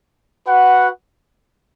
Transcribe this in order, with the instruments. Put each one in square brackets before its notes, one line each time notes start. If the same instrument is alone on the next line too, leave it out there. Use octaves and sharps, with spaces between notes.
[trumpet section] F#4 B4 F#5